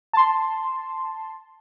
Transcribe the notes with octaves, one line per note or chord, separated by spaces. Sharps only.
A5 C6